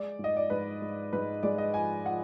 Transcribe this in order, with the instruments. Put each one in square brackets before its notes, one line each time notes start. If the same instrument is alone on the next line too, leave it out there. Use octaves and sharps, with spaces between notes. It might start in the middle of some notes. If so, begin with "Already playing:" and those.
Already playing: [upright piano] G#3 D5
G#2
D#5
D5
G#2 B4
G#2
G#2 B4
G#3 D5
D#5
F3 G#5
F3 F#5